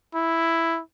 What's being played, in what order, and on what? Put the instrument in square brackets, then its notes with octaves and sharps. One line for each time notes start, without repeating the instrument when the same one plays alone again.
[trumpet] E4